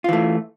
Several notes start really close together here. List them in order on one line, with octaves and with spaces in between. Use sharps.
F4 E3 A3